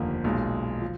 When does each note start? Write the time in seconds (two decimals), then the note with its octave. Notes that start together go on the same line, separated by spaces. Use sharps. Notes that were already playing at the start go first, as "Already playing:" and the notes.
Already playing: F1 D#2 D3 F3 A#3
0.24 B1 A#2 G#3
0.82 F3